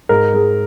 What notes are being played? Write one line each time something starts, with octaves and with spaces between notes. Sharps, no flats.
G#2 A#4
G#3